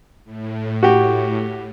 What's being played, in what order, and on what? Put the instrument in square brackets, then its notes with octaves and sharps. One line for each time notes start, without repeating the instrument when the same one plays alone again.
[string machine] A2
[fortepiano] F#4 G4